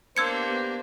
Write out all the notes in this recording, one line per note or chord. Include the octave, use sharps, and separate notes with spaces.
A#3 B3 D4 G4 C5 E6 G#6 C#7